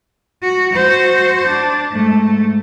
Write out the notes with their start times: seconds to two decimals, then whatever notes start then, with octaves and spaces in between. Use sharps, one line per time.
0.43 F#4
0.73 F#4 C5
1.48 D4
1.92 G#2 A3